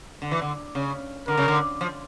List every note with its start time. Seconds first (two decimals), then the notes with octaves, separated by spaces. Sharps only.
0.22 D3
0.31 E3
0.42 D3
0.75 C#3
1.28 D3 A#4
1.37 C#3
1.48 D3
1.81 F3